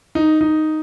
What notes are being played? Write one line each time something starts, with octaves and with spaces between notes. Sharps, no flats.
D#4
D#4